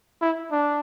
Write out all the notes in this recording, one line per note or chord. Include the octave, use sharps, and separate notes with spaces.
E4
D4